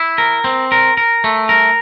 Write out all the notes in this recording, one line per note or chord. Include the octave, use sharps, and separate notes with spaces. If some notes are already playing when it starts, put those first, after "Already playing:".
Already playing: E4
A#4
C4
A#4
A#4
A3
A#4